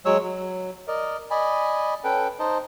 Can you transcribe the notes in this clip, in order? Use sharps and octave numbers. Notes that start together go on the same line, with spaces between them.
F#3 G#3 C#5 E6
F#3
A#4 D5 D#5
D5 D#5 G#5 B5
C#4 A4 B4 G5
D#4 C5 D#5 A5